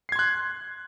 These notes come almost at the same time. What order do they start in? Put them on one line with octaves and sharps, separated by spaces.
C7 G#6 C6 F#6